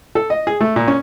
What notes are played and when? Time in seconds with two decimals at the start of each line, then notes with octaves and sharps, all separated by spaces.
0.15 A4
0.30 D#5
0.47 G#4
0.61 A3
0.76 A#2
0.88 C#4